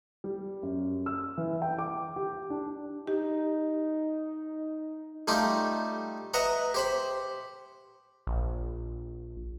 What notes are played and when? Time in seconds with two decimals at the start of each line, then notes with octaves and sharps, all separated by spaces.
0.24 G3
0.63 F#2
1.06 E6
1.37 E3
1.62 G5
1.79 D6
2.16 G4
2.50 D4
3.07 D#4 G4
5.28 G3 A3 D#4 F4 G4
6.34 B4 D#5 E5 F#5 A#5
6.74 G4 C5 B5
8.27 A#1